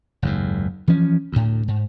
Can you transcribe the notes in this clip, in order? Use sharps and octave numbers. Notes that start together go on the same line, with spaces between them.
F#1 D#2 G#2
E3 F3 C#4
D2 A2
G#2